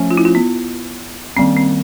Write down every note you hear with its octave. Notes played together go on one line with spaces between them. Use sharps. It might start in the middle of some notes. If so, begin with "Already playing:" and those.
Already playing: F3 A3 C#4
F4
E4
F4
B3
D#3 G3 A#3 C4 C#4
C4